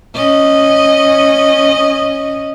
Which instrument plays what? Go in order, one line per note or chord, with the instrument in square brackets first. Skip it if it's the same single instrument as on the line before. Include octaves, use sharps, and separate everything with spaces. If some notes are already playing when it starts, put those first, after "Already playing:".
[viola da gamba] C#4 D#5